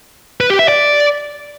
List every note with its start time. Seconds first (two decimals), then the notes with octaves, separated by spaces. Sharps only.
0.41 B4
0.50 G4
0.59 E5
0.68 D5